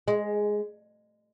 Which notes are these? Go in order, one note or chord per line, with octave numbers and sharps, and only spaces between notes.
G#3